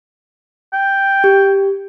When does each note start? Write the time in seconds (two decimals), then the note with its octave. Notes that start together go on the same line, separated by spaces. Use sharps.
0.73 G5
1.24 G4